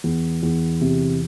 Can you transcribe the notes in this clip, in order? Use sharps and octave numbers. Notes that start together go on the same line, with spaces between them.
E2
E2
C3